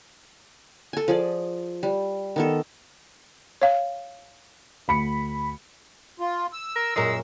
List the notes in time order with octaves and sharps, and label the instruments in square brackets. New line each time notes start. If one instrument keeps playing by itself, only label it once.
[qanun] A4 G#5
F3 G#4 D5
G3
D#3 B3 A4
[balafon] C#5 F5
[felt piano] D2 B5 C#7
[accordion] F4
E6
[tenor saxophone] A#4
[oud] F#2 A#2 A#4 [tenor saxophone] G#3